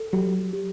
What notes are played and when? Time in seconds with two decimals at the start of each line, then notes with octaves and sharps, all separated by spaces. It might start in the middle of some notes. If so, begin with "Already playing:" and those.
Already playing: A4
0.13 F#3 G4
0.53 G4